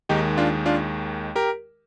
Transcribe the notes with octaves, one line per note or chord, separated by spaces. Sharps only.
D#2 D#3 G#3 D#4 G4
D4 F4
D4 F4
G4 A#4